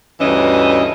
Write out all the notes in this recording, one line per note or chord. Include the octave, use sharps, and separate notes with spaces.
D2 G2 E3 C#4 D#5